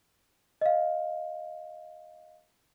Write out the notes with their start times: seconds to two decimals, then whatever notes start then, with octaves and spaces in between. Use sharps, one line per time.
0.61 D#5 F5